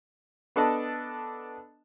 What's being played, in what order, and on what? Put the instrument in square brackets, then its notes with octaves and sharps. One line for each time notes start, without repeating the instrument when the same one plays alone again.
[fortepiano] B3 D4 A4 D5 D#5 A5